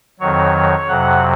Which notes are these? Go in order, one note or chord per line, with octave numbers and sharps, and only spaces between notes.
F2 D#3 F#3 C#5
F2 C3 F#3 F#5